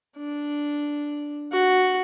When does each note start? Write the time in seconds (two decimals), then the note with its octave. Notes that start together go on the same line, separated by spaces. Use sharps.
0.17 D4
1.52 F#4